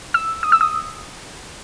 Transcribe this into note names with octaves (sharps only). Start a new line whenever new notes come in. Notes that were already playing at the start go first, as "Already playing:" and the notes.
E6
D#6
E6
D#6